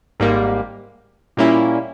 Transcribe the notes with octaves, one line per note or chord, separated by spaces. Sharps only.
G#1 G#2 G3 A#3
A#2 G3 A#3 C#4 E4